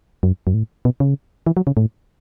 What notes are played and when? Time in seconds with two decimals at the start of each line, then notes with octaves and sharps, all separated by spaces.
0.23 F#2
0.47 F#2
0.54 A2
0.85 B2
1.00 C#3
1.47 E3
1.57 F#3
1.67 C#3
1.77 A2